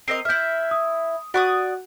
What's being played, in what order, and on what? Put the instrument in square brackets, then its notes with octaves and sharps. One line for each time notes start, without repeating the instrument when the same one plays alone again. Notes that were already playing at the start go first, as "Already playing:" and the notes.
[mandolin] C4 A#4 D#5 [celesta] C7
[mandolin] E4 E5 [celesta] F6 G6
[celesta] D#6
[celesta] F#4 F#5 F#6 [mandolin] D5 C#6 D#6